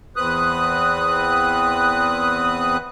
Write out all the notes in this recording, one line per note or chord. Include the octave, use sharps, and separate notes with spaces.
E2 C4 B4 D#6 F#6